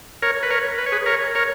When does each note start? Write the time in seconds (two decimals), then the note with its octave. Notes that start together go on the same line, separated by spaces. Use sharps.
0.22 A#4 C#5
0.43 B4
0.50 A#4 C#5
0.78 B4
0.86 C#5
0.92 G#4 B4
1.06 A#4 C#5
1.35 A#4 C#5